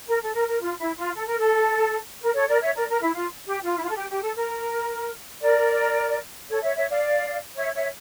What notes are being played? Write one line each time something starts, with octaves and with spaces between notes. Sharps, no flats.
A#4
A4
A#4
A#4
F4
E4
F4
A4
A#4
A4
A#4
A4 C#5
A#4 D5
C#5 E5
A#4 D5
A#4
E4
F4
G4
F4
E4
F4
A4
G4
G4
A4
A#4
A#4 D5
A4 C#5
C#5 E5
C#5 E5
D5 F5
C#5 E5
C#5 E5